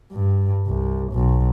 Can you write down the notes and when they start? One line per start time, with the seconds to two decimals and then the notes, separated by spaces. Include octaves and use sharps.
0.12 G2
0.67 C2
1.13 B1